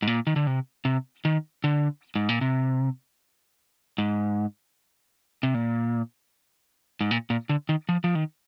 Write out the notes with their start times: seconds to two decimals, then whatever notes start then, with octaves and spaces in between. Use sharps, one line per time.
0.02 G#2
0.07 A#2
0.27 D#3
0.36 D3
0.47 C3
0.85 C3
1.25 D#3
1.64 D3
2.16 G#2
2.29 A#2
2.41 C3
3.98 G#2
5.43 C3
5.54 A#2
7.01 G#2
7.11 A#2
7.30 A#2
7.49 D3
7.69 D#3
7.89 F3
8.04 F3
8.15 D#3